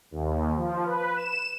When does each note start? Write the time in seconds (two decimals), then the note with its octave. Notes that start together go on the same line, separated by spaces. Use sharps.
0.11 D#2
0.56 F3
0.85 B4
1.16 E7